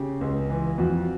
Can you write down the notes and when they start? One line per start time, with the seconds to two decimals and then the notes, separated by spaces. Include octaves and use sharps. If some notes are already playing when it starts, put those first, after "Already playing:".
Already playing: C#3 G4
0.21 C#2
0.50 E3
0.78 F2 F#4